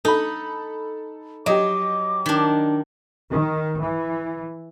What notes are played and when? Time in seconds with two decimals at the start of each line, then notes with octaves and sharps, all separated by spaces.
0.05 D#4 A4 B5
1.46 F#3 G4 D#5 D6
2.26 D#3 D4
3.31 D#3
3.81 E3